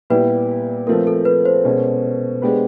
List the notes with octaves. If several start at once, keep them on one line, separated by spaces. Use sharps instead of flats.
A#2 G3 B3 E4 G4 B4
F3 A3 C4 F4 A#4
A4
B4
C5
B2 G#3 C#4
G#3 B3 D4 G4 B4